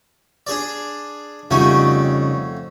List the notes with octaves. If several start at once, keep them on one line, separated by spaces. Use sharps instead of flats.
D4 G#4 D5
F2 C#3 G3 A3 D#4 F#4